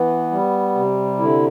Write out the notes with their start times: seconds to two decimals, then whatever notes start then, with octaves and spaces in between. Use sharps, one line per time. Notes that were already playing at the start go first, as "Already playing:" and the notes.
Already playing: E3 B3
0.31 G3
0.75 C3
1.19 D3 E4